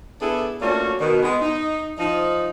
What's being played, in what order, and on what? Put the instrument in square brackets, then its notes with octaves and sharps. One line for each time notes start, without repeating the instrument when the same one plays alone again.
[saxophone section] B3 D4 E4 G#4 A4
A3 A#3 C#4 D4 F4 F#4
B2 D#3
G#3 B3
D#4
F3 D#4